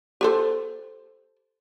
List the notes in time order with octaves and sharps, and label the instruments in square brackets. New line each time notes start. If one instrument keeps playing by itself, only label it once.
[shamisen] G4 A4 C5